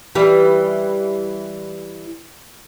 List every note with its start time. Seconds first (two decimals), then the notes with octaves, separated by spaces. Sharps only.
0.15 E3 G3